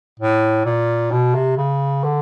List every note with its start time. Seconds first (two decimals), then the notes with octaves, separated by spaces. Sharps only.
0.20 A2
0.65 A#2
1.12 B2
1.35 C3
1.57 C#3
2.04 D3